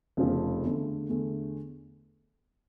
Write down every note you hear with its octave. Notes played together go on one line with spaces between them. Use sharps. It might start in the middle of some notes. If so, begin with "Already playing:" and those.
F1 E2 C#3 F3
E2 D3 A3
E2 D3 A3